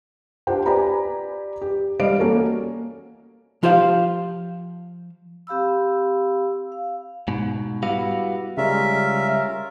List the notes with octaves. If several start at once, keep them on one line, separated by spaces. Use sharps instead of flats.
D4 F4 G4 C5 F#5 G5
G4 B4 D5 G#5 A#5 B5
G4
G3 D5 D#5 F5 D7
A#3 C#4 F#4 A4 A#4
F3 F4 G4 C5 E5 F5
C4 G4 F5 B5 E6
F5
G#2 B2
G3 B3 E4 F#4 F5
C#3 G3 G#3 C#4 F4 A#4 E5